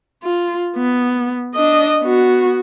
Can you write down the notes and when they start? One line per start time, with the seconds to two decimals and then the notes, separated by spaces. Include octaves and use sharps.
0.24 F4
0.76 B3
1.55 D4 D#5
2.02 B3 F#4